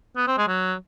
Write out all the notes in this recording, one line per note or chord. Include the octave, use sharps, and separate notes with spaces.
B3
C4
G#3
F#3